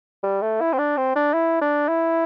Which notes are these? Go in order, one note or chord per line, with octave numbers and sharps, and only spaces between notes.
G3
A3
E4
C4
D4
C4
D4
E4
D4
E4